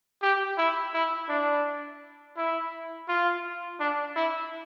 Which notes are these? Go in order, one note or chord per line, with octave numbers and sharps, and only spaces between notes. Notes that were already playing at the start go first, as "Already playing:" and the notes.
G4
E4
E4
D4
E4
F4
D4
E4